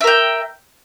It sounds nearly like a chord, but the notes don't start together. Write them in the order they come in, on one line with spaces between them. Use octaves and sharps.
E5 A#4 G5